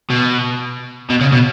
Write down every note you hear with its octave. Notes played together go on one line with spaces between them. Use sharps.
B2
B2
C#3
B2